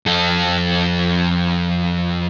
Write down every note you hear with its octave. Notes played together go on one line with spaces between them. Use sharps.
F2 A4